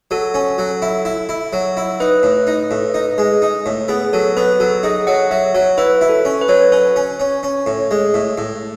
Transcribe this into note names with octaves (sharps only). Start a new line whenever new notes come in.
F#3 A4
C#4
F#3
E4
E4
E4
F#3
E4
D#4 B4
A2
D#4
A2
D#4
G#3
D#4
A2
B3 G#4
F#3 A4
B3 B4
F#3 A4
D#4 G#4
F#3 F#5
F#3 E5
F#3 C#5
E4 B4
E4
A4
C#4
B4
F#3 C#5
B4
C#4 C#5
C#4
C#4
C#4
A2
G#3
A2
A2